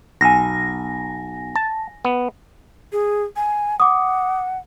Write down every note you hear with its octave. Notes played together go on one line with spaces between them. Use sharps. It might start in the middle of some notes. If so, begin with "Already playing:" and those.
B1 G#5 A#6
A5
B3
G#4
G#5
F#5 D6 D#6